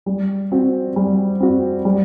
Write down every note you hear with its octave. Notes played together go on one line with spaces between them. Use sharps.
G3
C4 F#4
G3
C4 F#4
G3